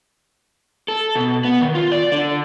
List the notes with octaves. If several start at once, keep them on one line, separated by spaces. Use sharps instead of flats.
A4
B2
B3
D#3
F4
D5
D3